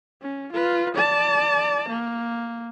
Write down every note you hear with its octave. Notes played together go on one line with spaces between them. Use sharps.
C#4
F4 B4
D5 A5
A#3